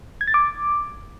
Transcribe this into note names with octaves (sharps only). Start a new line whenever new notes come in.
G#6
A6
D6